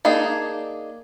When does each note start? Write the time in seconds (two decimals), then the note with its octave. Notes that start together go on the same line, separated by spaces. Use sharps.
0.05 A#3 D4 D#4 G#4